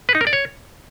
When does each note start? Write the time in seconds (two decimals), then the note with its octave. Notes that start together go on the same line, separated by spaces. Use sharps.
0.09 B4
0.15 D#4
0.21 A#4
0.27 D5
0.33 C#5